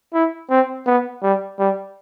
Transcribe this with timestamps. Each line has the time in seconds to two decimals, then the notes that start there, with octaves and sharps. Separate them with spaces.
0.14 E4
0.50 C4
0.86 B3
1.22 G3
1.59 G3